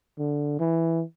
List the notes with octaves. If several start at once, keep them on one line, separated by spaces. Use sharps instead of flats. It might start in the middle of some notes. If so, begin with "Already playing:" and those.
D3
E3